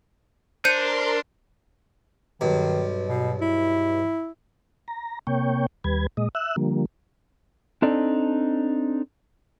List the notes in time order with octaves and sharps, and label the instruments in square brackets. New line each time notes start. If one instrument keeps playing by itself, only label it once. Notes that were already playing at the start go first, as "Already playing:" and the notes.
[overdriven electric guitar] D4 [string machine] A#4 C6 [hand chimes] C5 [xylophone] G6 C#7 D#7
[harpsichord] B1 G2 [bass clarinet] D#3
[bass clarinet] B2
E4
[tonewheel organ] A#5
C3 A#3 C#5 G5
D#2 G3 B4 G#6
A#2 G#3 D#5
E5 E6 F#6
D3 F3 G3 A#3
[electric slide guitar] C4 D4 D#4 A4 D5